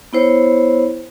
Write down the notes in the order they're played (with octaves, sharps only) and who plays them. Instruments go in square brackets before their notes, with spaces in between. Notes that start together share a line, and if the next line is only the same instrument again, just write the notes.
[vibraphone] B3 E4 C5 C#5